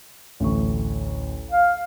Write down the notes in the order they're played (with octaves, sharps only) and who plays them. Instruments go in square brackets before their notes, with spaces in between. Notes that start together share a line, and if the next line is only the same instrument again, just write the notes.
[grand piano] A1 D2 C#6
[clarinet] F5